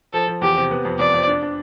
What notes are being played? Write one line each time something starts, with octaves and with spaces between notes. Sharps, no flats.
F3 A4
F3
E2 G4
C3
B3
F2
F2 D5
F2
D4
D4